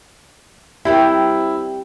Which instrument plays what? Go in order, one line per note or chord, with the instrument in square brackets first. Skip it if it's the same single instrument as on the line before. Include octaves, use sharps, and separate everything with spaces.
[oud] G3 C4 A#4 [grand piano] E4